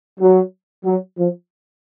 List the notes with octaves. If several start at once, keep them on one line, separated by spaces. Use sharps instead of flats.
F#3
F#3
F3